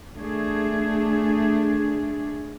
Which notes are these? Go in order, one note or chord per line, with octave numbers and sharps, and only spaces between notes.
A3 D4 G#4